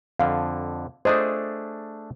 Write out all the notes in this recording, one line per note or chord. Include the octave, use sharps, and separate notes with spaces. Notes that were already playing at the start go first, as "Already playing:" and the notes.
F2 D3 F5
A3 D4 G#4 C5 D#5 D#6